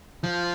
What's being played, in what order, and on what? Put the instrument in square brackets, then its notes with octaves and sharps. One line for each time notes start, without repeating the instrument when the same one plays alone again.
[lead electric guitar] F3